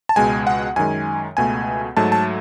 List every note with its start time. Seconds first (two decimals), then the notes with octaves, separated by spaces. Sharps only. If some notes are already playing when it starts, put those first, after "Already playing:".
0.09 A5
0.16 C#2 B2 G#3 G#5
0.47 F#5
0.76 F#2 D#3 G#3 G#5
1.37 C#2 B2 A3 G#5
1.97 G#2 F#3 A3 A5
2.12 A5